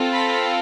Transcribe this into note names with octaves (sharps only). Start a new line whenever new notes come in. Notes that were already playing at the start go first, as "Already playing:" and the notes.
Already playing: C4 F4 A4
B5